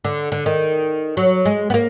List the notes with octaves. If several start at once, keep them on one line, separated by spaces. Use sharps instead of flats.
D3
D3
D#3
F#3
G#3
B3
A#3